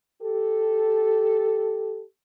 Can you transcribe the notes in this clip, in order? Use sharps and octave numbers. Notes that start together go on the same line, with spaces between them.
G4 A4